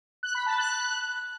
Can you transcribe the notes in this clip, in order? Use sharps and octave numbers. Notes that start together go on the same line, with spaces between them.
F#6
B5
A5
F#6